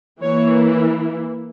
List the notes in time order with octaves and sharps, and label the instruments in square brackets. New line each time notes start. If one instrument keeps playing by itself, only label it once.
[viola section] E3 A#3 E4 C#5